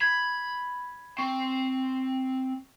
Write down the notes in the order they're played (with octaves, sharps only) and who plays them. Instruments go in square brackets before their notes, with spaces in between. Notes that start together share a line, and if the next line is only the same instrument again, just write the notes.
[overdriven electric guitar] B5 [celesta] G#6
[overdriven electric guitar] C4 [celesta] C#6